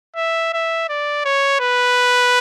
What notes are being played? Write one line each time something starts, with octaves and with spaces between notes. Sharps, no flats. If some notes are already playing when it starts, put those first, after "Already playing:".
E5
E5
D5
C#5
B4